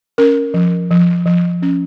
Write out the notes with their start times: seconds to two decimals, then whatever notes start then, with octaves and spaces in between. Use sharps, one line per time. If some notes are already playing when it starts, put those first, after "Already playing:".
0.18 C#4 A#4
0.54 F3
0.91 F3
1.26 F3
1.62 C#4